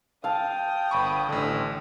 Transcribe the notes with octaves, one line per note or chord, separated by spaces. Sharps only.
F5 G5 A5 D#6
G1 B5 C#6
A1 D3